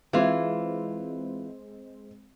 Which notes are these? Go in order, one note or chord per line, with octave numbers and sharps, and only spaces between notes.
E3 G#3 C4 F4